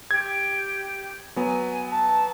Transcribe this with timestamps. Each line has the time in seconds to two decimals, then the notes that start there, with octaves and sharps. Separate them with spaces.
0.11 G4 G#6
1.36 F#3 B3 G#5
1.91 A5